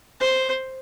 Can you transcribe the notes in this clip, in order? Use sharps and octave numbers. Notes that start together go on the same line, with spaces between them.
C5